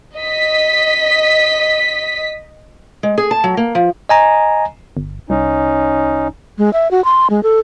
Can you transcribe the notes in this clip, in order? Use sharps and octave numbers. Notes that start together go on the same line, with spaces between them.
D#5 B6
G#3
G#4
A5
F#3
A#3
F3
D#5 G#5 A#5
G1
C2 C#4 D#4
G#3
E5
F#4
C6
G#3
A4